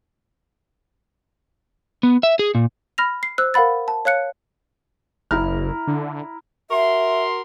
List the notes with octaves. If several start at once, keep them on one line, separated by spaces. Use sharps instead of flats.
B3
E5
G#4
A#2
B5 F6 A#6 F7
C7
C5 E6 F#6
A#4 F5 F#5 B5 A6
A5
C#5 F5 F#6 C#7
F#1 E4 A#5 F6
D3
F#4 A#4 E5 C6